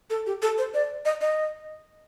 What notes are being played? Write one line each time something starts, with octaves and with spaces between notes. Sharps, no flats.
A4
G4
A4
C5
D5
D#5
D#5